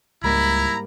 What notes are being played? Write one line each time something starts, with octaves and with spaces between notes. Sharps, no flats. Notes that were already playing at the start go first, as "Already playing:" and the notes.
C#2 G#2 G3 A#3 E4 A#5 B5